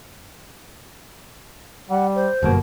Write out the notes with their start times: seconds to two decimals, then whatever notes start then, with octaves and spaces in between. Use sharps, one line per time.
1.90 G3 F#5
2.15 C5
2.43 G1 F#2 B2 A#3